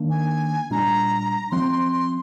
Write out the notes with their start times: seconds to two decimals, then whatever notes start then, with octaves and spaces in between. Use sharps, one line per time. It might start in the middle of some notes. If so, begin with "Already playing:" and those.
Already playing: D#3 A#3 D4
0.10 G#5
0.70 A#2 G3 D4 A#5
1.51 F3 C4 C6
1.71 C6
1.92 C6